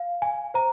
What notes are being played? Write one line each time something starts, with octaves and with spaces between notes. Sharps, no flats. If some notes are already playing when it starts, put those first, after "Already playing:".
Already playing: F5
G#5
C5 A#5